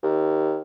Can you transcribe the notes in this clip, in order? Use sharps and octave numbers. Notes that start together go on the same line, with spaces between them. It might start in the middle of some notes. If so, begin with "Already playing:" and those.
D#2